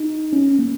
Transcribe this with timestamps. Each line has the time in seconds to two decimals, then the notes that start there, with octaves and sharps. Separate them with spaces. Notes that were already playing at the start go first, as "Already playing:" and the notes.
Already playing: D#4
0.33 C#4
0.59 A#3